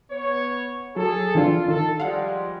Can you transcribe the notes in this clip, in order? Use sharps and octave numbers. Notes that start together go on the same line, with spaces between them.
B3 C#5
F#3 G#4 A4
E3 C4 D4 F4
D#3 A4
F3 G3 G#3 F5 F#5